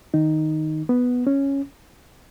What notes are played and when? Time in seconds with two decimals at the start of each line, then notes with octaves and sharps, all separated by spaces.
0.14 D#3 D#4
0.89 B3
1.27 C#4